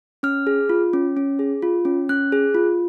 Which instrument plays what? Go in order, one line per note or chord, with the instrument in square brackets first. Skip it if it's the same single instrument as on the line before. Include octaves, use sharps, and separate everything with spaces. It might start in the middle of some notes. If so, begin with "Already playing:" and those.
[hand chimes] C#4 F6
G#4
F4
C#4
C#4
G#4
F4
C#4
C#4 F#6
G#4
F4